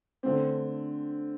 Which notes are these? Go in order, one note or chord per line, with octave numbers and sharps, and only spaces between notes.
D3 A3 C4